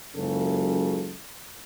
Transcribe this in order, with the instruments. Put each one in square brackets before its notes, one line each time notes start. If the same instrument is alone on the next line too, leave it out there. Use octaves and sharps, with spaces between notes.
[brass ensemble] F#1 C#2 F#2 C#3 C#4 A4